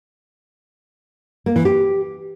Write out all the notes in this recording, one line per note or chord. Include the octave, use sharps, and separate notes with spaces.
A#3
E3
G4